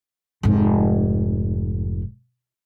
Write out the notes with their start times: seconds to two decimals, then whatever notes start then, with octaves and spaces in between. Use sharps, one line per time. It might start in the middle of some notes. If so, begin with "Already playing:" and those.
0.43 F1 G#2